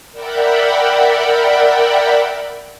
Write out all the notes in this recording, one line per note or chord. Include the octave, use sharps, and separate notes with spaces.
A#4 D5 E5 F#5 G5 B5